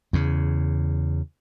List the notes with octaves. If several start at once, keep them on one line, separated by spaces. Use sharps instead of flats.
E2 C#3